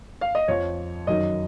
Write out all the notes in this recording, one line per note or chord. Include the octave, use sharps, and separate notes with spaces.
F5
D#5
F2 F3 C#5
F#2 D#3 F#3 D#5